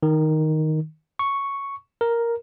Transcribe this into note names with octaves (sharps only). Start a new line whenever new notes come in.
D#3
C#6
A#4